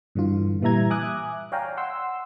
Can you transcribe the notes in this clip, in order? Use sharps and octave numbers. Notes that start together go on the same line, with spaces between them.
G2 D3 E3 F4
A#2 E3 G3 E5 A#5 G#6
E5 G#5 D6 D#6 F#6
C#5 D5 F5 G5 G#5 A#5
F#5 C6 E6